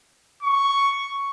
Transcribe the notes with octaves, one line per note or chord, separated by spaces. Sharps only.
C#6